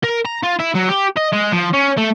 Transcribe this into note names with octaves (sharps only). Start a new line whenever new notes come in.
A#4
A#5
F4
E4
F#3
G4
D#5
G#3
F3
C#4
A3